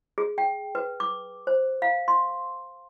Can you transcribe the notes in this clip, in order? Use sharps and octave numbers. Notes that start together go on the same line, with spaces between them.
G#4
G5
B4
D6
C5
F5
C6